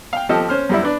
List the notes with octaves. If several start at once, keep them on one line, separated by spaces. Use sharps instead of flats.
F5 G5
F3 G4 A4 D#5
C#4 C5 F6
F#2 G3 E4
D4 B4